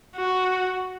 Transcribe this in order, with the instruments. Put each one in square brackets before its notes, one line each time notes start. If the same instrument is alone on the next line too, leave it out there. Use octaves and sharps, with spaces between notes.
[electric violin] F#4